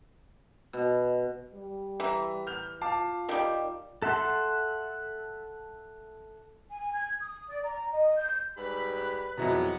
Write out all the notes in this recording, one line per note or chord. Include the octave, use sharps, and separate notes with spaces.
B2
G3
E3 E5 A#5
F6 G6 F7
F4 F5 A5 D6
D#3 G3
A4 E5 F#5 C6
G#5
G#6
D#6
D5
A#5
D#5
G6
G#2 G3 B4 B5
F#6
F2 B2 F#3 G#3 B3 E4 E5 A#5